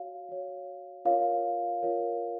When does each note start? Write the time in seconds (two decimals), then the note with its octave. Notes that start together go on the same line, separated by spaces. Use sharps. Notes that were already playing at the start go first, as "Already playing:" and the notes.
Already playing: F#4 C#5 F5
0.29 F#4 C#5
1.05 F4 A#4 C#5 F5
1.83 F4 A#4 C#5